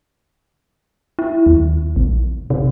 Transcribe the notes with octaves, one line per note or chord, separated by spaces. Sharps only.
E4
D#2
A#1
C3